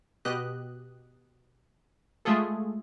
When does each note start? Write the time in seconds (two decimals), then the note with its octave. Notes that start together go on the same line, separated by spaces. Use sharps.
0.25 B2 G4 D#5 F#6
2.25 G#3 A3 F4 G#4 A4